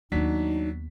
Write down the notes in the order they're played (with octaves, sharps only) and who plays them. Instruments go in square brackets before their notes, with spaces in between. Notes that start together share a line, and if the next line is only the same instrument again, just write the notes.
[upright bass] D#2 B3 [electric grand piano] F#3 D4 B6 [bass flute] D#4